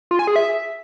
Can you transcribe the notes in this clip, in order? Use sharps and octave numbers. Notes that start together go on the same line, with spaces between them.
F4
G#5
G#4
E5